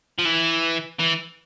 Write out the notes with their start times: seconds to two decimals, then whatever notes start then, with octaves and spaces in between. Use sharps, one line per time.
0.19 F3
0.25 E3
0.99 E3